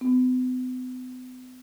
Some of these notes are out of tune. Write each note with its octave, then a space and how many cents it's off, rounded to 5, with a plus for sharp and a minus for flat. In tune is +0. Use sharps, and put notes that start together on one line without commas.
B3 +45